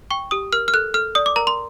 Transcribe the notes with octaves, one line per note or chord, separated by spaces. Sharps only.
G5 C#6
G4 D#6
A#4 F6
F6
A4 F#6
A4 F6
D5 D#6
D6
A#4 A#5
C6